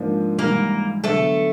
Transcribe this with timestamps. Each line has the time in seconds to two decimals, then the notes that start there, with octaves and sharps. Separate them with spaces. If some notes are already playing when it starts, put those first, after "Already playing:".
Already playing: G#2 F3 A#3 D4
0.39 G#2 E3 G3 A#3 A#4
1.04 D3 F#3 A3 B3 A4